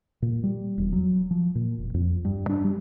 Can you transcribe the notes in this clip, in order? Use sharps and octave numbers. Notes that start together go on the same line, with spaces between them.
A#2
G3
E1
F#3
F3
A#2
E1
F2
G2
D4
G3